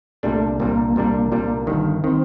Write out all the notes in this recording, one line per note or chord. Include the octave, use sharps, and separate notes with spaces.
C2 A#2 G3 A3 D4
C2 A#2 G3 A#3 D4
C2 A#2 G3 D4
C2 A#2 G3 D4
G1 G2 D#3
D#3 C4